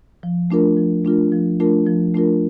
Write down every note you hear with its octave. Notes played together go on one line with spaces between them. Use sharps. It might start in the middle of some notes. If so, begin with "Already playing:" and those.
F3
A3 D4 F4 A#4
F3
A3 D4 F4 A#4
F3
A3 D4 F4 A#4
F3
A3 D4 F4 A#4